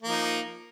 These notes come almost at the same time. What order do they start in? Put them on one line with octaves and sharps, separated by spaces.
A#3 F3 D#4